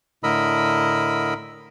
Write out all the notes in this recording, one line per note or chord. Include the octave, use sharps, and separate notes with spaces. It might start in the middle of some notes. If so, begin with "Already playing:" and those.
A2 D3 A#4 D#5 B5 E6